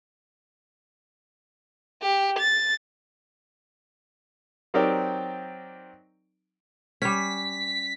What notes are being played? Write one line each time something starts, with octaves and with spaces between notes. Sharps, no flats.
G4
A6
F#3 C4 D#4 G4 A#4 D5
G3 C#4 B6